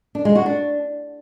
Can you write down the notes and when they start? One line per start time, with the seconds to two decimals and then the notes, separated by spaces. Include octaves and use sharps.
0.15 D4
0.25 G#3
0.35 F#4
0.46 D4